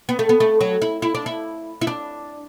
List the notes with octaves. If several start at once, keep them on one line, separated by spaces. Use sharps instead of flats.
B3
A3
B3
A3
F#3
E4
E4
D4
E4
E4
D4